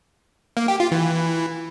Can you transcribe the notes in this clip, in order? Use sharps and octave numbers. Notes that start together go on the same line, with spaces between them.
A#3
G4
F4
E3